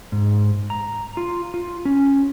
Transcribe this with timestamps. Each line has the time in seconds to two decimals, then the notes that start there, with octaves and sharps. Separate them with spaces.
0.12 G#2
0.70 A#5
1.17 F4
1.54 F4
1.85 C#4